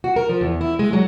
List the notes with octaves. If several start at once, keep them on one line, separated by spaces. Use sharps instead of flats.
F#4
A#4
F3
E2
E4
G#3
F#3